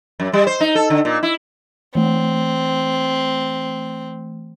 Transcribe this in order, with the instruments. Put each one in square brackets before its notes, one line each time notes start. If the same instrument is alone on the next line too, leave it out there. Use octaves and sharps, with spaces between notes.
[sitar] F#2
G3
C5
D#4
A4
D3
A#2
E4
[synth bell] E3 A3 [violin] C4